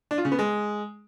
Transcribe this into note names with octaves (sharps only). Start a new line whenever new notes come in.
D4
F4
C#3
B3
G#3